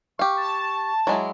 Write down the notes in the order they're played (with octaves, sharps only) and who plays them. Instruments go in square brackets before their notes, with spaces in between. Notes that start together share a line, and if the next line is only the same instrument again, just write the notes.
[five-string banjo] G4 F5 [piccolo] C#6
[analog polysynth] A5
[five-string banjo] F#3 G#3 E4